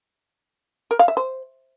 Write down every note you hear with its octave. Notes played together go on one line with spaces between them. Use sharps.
A#4
F5
E5
C5